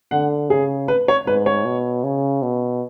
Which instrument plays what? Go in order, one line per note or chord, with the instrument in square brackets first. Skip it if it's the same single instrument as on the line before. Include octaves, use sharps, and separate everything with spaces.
[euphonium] D3 [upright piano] F#5
[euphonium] C#3 [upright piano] G#4
[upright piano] B4
C#5
[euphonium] G#2 [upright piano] B4
[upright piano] C#5
[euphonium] B2
C#3
B2